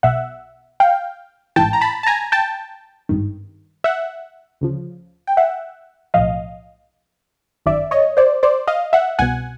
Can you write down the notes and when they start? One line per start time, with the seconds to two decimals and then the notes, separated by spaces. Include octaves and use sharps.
0.03 B1 B2 E5 F#5
0.80 F5 G5
1.56 A1 G#2 E3 G5 A5
1.73 A#5
1.81 A5 B5
2.03 A5
2.07 G#5 A#5
2.32 G5 A5
3.09 G#1 G2 D#3
3.84 E5 F#5
4.61 D2 C#3 F3
5.27 G5
5.37 E5 F#5
6.14 B1 A2 F3 D#5 F5
7.66 G1 F#2 D#3 D5 E5
7.91 C#5 D#5
8.17 C5 D5
8.43 C5 D5
8.68 D#5 F5
8.93 E5 F#5
9.19 C2 B2 F#5 G#5